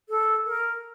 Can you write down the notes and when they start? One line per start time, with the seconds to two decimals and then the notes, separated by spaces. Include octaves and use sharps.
0.09 A4
0.46 A#4